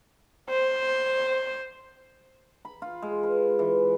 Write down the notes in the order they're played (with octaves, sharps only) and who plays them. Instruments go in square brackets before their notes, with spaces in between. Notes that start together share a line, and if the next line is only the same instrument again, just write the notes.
[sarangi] C5
[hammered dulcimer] B5
F4
G#3
B4
E3